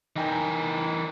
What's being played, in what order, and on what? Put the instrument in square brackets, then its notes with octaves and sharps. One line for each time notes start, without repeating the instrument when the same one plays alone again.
[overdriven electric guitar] E3 A#4 [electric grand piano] D#4 G5 G#5